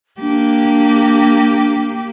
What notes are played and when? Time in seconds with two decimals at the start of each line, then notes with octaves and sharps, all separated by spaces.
0.21 A#3 D4 G4